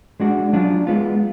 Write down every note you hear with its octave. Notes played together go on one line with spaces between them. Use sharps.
G#3 D4 F#4
F#3 D4 F4
G#3 B3 F4